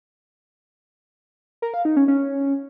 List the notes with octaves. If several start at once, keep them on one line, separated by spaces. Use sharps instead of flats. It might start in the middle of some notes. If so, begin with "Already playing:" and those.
A#4
F5
D#4
C#4
C#4